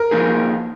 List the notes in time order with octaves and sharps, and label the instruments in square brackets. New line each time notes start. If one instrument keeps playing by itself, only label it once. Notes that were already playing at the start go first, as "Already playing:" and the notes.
Already playing: [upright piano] A#4
[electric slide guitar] F3 A#3 D#4 G#4